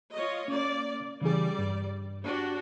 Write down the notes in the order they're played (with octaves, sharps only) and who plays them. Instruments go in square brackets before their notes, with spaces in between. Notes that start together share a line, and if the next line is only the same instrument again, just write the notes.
[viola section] F4 C#5 D#5
[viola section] A#3 D5 [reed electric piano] C#4
[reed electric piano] C#3 E3 G#4 [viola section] G3 D5
[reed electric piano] G2
[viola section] D4 F#4 G4